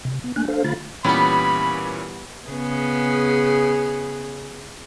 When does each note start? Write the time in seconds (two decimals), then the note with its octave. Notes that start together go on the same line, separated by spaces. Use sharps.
0.05 C3
0.24 B3
0.36 A3 A#3 D4 G#5 F#6
0.48 D4 A4 C5 F5
0.64 D3 A3 F4 F5 B5 A6
1.04 A#2 E3 G3 B3 C#4 B5
2.48 C#3 B3 G#4